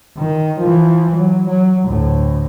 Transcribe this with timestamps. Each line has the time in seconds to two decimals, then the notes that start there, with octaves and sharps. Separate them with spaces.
0.18 D#3
0.60 E3 F3
1.16 F#3
1.48 F#3
1.86 D2 A2